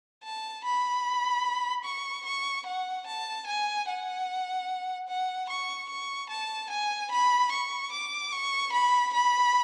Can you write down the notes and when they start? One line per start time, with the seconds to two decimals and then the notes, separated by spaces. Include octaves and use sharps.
0.24 A5
0.64 B5
1.85 C#6
2.26 C#6
2.66 F#5
3.07 A5
3.47 G#5
3.88 F#5
5.08 F#5
5.50 C#6
5.89 C#6
6.30 A5
6.70 G#5
7.11 B5
7.52 C#6
7.93 D6
8.32 C#6
8.73 B5
9.14 B5